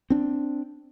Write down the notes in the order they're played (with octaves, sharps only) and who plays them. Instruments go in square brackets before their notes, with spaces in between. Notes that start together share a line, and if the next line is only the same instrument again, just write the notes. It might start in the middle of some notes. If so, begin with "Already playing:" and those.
[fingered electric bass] C4 D4